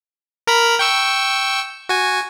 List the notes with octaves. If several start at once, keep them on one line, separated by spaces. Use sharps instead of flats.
A#4 A#5 B5
G5 C#6 E6
F#4 G#5